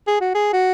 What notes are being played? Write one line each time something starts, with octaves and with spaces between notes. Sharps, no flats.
G#4
F#4
G#4
F#4